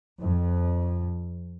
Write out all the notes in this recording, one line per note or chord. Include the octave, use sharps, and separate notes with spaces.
F2